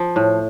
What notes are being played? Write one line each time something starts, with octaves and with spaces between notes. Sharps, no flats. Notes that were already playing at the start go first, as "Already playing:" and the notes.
Already playing: F3
A2